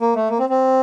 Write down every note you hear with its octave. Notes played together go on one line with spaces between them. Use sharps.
A#3
A3
A#3
C4
C4